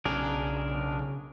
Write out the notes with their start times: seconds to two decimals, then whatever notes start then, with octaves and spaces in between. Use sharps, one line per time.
0.05 B1 C#3 D4 G#4 A#4